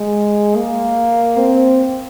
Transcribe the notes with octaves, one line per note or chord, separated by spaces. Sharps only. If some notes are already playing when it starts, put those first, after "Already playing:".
Already playing: G#3
A#3
C4